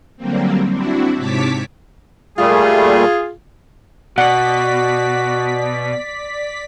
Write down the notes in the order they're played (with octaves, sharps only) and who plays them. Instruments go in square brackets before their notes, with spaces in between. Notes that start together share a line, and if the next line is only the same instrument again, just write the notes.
[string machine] D3 F#3 G3 A#3 C4
C4 D4 E4 F#4
G#2 C3 C#5 A5 D6 B6
[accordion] A#2 G3 A3 [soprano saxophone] F4 [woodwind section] G#4
[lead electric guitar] B2 [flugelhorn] F#4 [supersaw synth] D5 B6 [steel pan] F#5